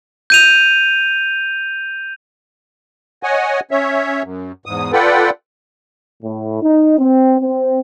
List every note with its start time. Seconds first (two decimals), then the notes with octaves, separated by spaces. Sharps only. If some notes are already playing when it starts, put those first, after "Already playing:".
0.30 G6 D#7 F7
3.23 C#5 D#5 F#5 G#5
3.71 C#4 C#5 E5
4.23 F#2
4.66 E2 G#2 D#6
4.93 F4 A4 B4 D5 F#5 G5
6.23 A2
6.62 D#4
6.98 C4
7.41 C4